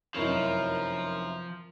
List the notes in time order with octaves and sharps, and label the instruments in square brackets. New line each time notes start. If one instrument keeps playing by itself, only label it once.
[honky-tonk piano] F1 F#2 E7 [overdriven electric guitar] F3 [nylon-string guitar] D#4 E4 C#5 [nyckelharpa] A#4